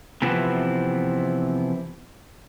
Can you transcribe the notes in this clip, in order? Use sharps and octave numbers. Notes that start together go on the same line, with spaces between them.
C3 E3 F3 B3 C4 E4